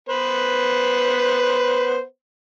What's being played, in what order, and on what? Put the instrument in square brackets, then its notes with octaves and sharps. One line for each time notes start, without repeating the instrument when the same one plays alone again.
[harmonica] B3 B4 C5